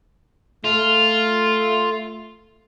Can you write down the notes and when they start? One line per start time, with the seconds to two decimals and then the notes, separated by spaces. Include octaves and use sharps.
0.64 A3 F4